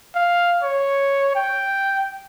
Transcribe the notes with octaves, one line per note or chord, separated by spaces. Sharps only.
F5
C#5
G5